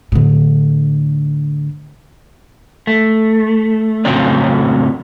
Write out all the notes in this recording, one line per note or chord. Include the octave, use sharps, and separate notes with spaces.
A2 D3
A3
F2 A2 C#3 F#3 C4 D5